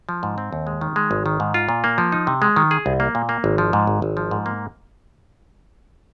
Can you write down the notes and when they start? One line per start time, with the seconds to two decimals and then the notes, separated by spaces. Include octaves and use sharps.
0.09 F3
0.23 G#2
0.38 C4
0.53 D#2
0.67 G#3
0.81 D#3
0.96 G#3
1.11 G#1
1.26 D#3
1.40 G#2
1.54 F4
1.69 A#2
1.84 A#3
1.98 F3
2.12 D#4
2.27 C3
2.42 G#3
2.56 D#3
2.71 G#4
2.86 C2
3.00 A#3
3.15 A#2
3.29 A#3
3.44 G#1
3.58 F3
3.73 G#2
3.87 G#1
4.02 G#1
4.17 F3
4.31 G#2
4.46 A#3